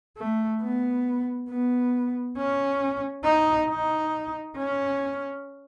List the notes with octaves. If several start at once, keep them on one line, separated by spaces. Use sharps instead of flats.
A3
B3
B3
C#4
D#4
D#4
C#4